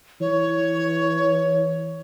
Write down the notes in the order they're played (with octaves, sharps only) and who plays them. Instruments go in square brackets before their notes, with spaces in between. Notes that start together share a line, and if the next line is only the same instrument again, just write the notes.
[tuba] E3 [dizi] C#5